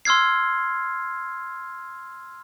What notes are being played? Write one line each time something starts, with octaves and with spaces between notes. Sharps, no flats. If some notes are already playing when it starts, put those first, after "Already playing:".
C6 E6 F6 G#6 C7